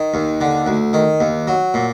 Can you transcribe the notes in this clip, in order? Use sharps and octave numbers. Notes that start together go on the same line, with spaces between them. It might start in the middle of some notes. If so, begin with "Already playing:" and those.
Already playing: D#3
D#2
D3
D2
D#3
D#2
F#3
A#2